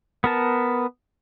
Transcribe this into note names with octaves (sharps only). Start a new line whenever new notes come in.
B3 A#4 A5